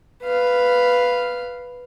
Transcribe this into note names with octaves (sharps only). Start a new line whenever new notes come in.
B4 F5